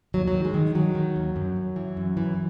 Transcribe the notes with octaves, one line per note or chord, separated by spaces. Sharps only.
D#2 F#3
F#3
D#3
G#3
D#3
D#3 F#3
D#3
D#2
F#2
F#2
E3
F#2
E3